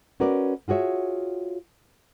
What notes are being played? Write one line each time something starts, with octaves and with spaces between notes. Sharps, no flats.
C#4 F#4 A#4 B4 D5
F4 F#4 G#4 C#5 E5